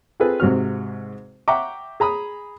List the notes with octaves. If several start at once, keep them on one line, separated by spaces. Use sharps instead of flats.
C4 F4 G#4 A4 B4
G#2 C3 F#4 F6
E5 F#5 G5 A#5 C#6 D6
G#4 A#5 B5 D#6